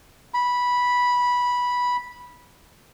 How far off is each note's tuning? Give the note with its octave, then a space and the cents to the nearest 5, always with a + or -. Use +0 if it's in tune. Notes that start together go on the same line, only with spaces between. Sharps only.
B5 -10